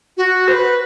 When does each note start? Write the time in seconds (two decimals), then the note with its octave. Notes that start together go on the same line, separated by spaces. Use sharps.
0.17 F#4
0.48 C5
0.53 B4